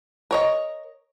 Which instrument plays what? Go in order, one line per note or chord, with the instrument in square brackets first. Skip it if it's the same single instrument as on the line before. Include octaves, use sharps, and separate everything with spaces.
[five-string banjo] A#4 C#5 D#5